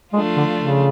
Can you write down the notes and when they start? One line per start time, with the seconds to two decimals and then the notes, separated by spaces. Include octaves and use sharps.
0.13 F3 G#3 A3 D4 F4
0.37 D3
0.59 C#3